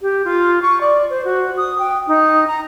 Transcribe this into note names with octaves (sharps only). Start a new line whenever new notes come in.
G4
F4
C#6
D5
C5
F#4
D#6
G5
D#4
A#5